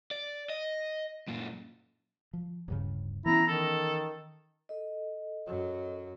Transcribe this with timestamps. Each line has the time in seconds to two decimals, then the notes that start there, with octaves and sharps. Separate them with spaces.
0.11 D5
0.50 D#5
1.28 F#2 A#2
2.33 F3
2.68 D1 G2 C#3
3.26 E3 B3 C#4 E4 A#5
3.48 D#3 A4
4.69 A4 D#5
5.47 F#2 F#3